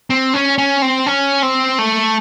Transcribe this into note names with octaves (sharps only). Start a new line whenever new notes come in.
C4
C#4
C#4
C4
C#4
C4
A3